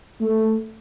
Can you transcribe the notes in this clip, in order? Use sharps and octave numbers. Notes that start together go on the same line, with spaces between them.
A3